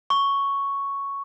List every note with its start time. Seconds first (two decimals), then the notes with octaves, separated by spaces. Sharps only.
0.10 C#6